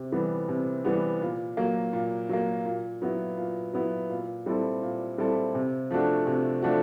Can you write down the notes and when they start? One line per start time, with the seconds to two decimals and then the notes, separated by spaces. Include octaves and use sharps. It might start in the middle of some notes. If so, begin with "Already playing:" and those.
Already playing: C3
0.12 E3 G3 B3
0.49 C3
0.85 E3 G3 B3
1.21 A#2
1.57 F#3 A#3
1.93 A#2
2.29 F#3 A#3
2.66 A#2
3.02 F#3 B3 E4
3.37 A#2
3.74 F#3 B3 E4
4.09 A#2
4.46 G3 C4 E4 A4
4.82 A#2
5.18 G3 C4 E4 A4
5.55 C3
5.91 F3 A3 D4 F#4
6.27 C3
6.62 F3 A3 D4 F#4